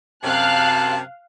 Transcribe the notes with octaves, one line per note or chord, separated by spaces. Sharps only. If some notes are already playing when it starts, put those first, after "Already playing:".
F#2 C3 F5 A5 F#6